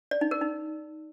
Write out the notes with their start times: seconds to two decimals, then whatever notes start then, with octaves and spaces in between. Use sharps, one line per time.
0.11 D5
0.21 D#4
0.31 A#4
0.41 D#4